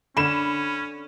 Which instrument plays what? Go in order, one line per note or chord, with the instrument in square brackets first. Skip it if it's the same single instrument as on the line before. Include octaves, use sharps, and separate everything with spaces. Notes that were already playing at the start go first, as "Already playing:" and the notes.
[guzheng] D3 [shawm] C#4 [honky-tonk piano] B5 E7